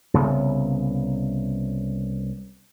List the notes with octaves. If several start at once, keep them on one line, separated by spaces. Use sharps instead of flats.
C2 C#3 B3